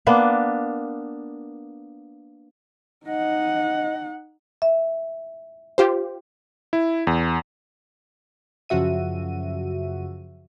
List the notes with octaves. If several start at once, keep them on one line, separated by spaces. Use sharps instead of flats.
A#3 B3 D4 B4
D#4 D#5 F#5
E5
F4 G4 C5
E4
E2
F#2 C#3 F3 F#4 E5 D#7